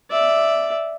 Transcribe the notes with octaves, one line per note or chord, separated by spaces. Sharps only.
D5 E5